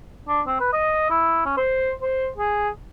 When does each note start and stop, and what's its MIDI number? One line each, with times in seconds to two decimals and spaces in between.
0.28 0.41 62
0.47 0.57 60
0.60 0.69 71
0.73 1.10 75
1.10 1.44 64
1.46 1.54 61
1.57 1.92 72
2.02 2.28 72
2.38 2.69 68